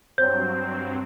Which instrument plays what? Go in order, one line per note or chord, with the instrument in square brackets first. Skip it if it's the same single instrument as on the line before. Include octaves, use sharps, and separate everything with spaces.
[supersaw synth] G2 F#3 C4 [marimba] C5 C#5 [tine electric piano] G6